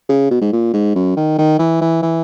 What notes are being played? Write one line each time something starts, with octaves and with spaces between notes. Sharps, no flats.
C#3
B2
G#2
A#2
G#2
F#2
D#3
D#3
E3
E3
E3